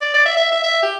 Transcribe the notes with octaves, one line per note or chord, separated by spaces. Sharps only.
D5
D5
E5
E5
E5
E5
G4